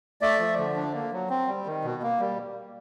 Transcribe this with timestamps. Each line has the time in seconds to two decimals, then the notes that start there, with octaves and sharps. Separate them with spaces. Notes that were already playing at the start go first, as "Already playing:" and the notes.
0.21 A3 D5 E5
0.39 F3
0.58 D3
0.76 D4
0.94 A#3
1.12 F#3
1.30 C4
1.47 G3
1.66 D#3
1.84 B2
2.02 A#3
2.20 G3